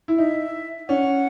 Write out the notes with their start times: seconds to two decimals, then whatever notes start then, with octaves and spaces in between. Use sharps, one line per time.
0.08 E4
0.18 D#4 E5
0.88 C#4 F#5